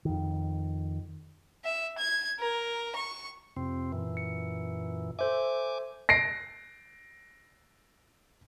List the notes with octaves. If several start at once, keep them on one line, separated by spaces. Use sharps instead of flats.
F2 D#3
E5
G#6
A#4
C#6
F2 C3 C4
F#2 A#2 E3
C#7
A4 C5 E5 G#5 D6
A#6 C7 D7